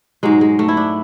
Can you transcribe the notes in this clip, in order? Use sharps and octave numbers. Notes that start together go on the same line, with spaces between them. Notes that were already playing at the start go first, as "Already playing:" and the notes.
G#2 F#3 G#3
G#3
A3
E4
D4